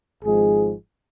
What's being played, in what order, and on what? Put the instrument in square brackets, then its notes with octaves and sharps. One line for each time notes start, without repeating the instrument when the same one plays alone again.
[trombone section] G#1 G#2 F3 G#3 G#4